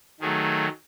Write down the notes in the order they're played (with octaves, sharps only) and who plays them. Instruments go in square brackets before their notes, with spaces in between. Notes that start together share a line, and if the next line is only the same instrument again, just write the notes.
[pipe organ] D#3 F#3 A3 G#4